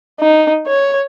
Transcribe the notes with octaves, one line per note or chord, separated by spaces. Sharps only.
D#4
C#5